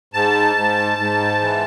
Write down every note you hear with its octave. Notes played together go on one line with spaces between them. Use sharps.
G#2 A5
G#2
G#2
E3